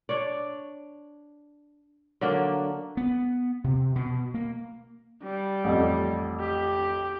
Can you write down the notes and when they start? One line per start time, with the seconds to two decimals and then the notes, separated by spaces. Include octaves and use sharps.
0.09 D4 C#5 D5
2.21 D3 F#3 A#3 D4
2.97 B3
3.64 C3
3.95 B2
4.34 A#3
5.23 G3
5.64 A1 F2
6.40 G4